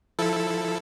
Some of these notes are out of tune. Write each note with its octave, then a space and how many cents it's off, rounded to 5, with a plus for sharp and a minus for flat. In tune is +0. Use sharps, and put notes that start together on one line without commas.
F3 +0 E4 +0 A4 +0